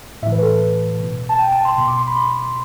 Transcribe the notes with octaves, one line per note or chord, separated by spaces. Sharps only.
A2 E3 E5
B4
A4
B2
A5
G5
A5
C6
B2 C6
D6
C6
B5